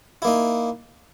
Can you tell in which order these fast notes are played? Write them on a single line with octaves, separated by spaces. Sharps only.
E4 A#3 D#4